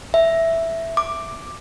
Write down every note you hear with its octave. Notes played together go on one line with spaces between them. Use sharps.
E5
D6